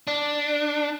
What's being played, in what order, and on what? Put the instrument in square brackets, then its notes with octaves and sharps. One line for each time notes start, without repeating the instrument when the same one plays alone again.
[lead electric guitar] D4